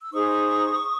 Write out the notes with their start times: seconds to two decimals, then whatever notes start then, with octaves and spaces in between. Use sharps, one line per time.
0.01 E6
0.12 D#4 G#4 C5 C#6 D#6